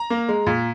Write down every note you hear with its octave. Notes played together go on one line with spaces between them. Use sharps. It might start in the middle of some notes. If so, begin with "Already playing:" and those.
Already playing: A#5
A#3
G#3
A#2